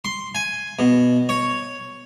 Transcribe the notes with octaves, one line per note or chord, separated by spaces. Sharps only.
C6
G#5
B2
C#5